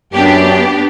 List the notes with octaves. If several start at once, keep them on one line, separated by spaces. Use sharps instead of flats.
F#2 B3 D4 G4